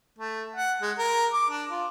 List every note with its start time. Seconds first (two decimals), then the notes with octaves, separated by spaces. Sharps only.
0.19 A3
0.56 F#5
0.82 G#3
0.98 A#4
1.33 D6
1.50 D4
1.71 F4